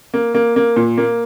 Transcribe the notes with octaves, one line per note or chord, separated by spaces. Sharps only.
A#3
A#3
A#3
A#2
A#3